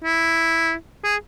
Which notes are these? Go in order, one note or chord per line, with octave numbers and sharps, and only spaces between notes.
E4
G#4